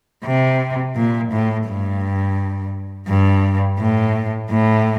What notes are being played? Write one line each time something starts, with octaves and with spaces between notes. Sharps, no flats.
C3
A#2
A2
G2
G2
A2
A2